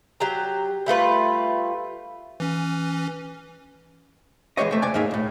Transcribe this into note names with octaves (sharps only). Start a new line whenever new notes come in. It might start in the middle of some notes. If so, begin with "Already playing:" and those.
F#3 G4 A#5
G3 A3 F4 B4
E3 C#4
E3 G#3 G4 G#4 C#5 D#5
C3 A3
D#2 C3 D5 G#5
D#2 G#2 A#3 D#4 G#4 E5
B1 A2